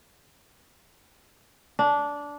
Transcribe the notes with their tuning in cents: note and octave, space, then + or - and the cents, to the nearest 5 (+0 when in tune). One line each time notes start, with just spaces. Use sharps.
D4 -15